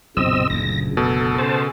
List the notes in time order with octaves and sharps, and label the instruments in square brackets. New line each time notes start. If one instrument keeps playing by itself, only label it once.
[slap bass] B1 [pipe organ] F#2 A#2 C#3 [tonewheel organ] C4 D#5 E6
[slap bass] F#1 D2 [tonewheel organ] A#6
[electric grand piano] B2 [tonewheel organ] A4
[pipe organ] C#3 C#4 A4 [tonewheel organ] C5 A5